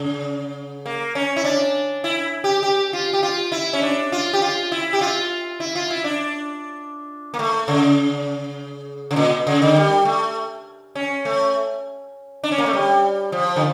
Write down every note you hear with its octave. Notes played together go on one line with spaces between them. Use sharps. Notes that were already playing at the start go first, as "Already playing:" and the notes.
Already playing: C#3
A#3
C#4
E4
D4
E4
G4
G4
F4
G4
F4
E4
C#4
D4
F4
G4
F4
E4
G4
F4
E4
F4
E4
D4
A#3
A3
C#3
C#3
A#2
C#3
D3
G3
A3
C#4
A3
D4
C#4
A#3
A3
G3
F3
D3